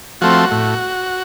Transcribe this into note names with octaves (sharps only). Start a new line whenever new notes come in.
F3 A3 C4 F#4
A2